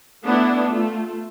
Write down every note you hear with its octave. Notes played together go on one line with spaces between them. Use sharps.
A3 B3 D4 E4
A3 F4